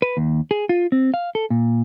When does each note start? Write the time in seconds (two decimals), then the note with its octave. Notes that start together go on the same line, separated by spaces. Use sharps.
0.02 B4
0.17 D#2
0.51 G#4
0.69 F4
0.92 C4
1.14 F5
1.35 A4
1.50 A#2